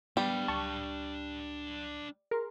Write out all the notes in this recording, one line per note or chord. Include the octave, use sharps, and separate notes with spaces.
G3 B3 D4 G4 F5
C#2 A5 C#6
G#4 A#4 C6